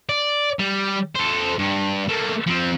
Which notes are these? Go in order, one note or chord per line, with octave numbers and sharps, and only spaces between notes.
D5
G3
A4 C5
G2
A3 A#3
F3 C4